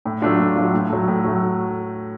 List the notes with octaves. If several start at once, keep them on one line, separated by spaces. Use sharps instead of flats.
A2
F#3 A3 D4 F4
A2
F#3 A3 D4 F4
A2
F#3 A3
A2
F#3 A3